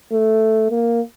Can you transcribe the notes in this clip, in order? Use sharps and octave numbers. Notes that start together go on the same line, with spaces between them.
A3
A#3